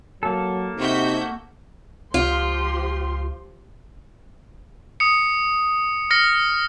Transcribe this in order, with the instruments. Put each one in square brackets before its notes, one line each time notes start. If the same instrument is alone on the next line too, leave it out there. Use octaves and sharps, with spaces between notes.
[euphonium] F#3 [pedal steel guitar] A#3 A4
[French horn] C3 [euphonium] D#4 [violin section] F#4 E5 G6
[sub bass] C#2 [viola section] F3 G4 C6 [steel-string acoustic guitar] F4
[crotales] D#6 C#7
F6 A#6 C#7